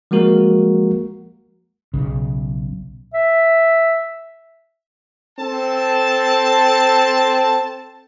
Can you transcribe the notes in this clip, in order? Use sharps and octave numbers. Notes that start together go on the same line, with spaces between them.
F3 G#3 A#3 F#4 A#4
B1 C#3
E5
C4 A4 A5